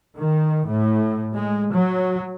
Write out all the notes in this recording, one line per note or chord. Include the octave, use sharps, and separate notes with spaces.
D#3
A2
G#3
F#3